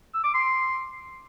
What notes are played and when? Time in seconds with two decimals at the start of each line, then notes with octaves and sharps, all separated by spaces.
0.14 E6
0.24 D6
0.34 C6